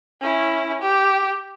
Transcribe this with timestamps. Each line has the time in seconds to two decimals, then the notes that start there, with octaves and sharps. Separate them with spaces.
0.21 C#4 E4
0.82 G4